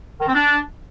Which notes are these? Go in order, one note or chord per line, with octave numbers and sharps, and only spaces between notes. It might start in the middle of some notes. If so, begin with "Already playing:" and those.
D#3
C4
D4